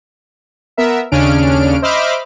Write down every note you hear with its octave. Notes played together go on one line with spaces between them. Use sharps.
B3 A#4 E5
D#2 C#3 C#4 D4 F6 D7
C5 D#5 E5 B5 D6 F6